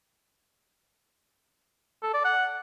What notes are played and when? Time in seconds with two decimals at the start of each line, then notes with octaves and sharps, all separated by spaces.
2.03 A4
2.14 D5
2.24 F#5